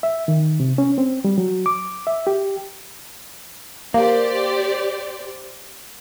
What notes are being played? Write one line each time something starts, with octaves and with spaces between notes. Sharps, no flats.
E5
D#3
C3
C#4
C4
G3
F#3
D6
E5
G4
A#3 G4 C5 D5